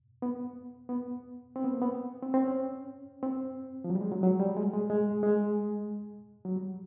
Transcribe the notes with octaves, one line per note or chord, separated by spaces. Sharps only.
B3
B3
C4
B3
A#3
B3
C4
C4
C#4
C4
F3
F#3
G3
G#3
F#3
F#3
G3
G#3
G#3
G#3
G#3
F#3
G3